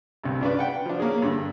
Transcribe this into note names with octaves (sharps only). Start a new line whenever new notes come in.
C2 G2
C#3 D4 B4 D5
B4 F#5 G5
F3 D4
A#3 C#4 G#4
G2 D3